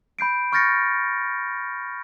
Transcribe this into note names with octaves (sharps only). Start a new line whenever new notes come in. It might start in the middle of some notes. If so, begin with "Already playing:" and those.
B5 G6 C7 D7
C#6 F6 G6 A6 A#6 C#7